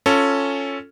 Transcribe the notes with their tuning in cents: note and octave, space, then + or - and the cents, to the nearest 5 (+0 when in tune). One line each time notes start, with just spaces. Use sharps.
C#4 +0 F4 +0 A4 +10